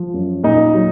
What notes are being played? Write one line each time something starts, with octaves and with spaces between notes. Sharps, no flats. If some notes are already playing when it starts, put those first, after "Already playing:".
Already playing: F3
F#2
A#2 D#4
F#3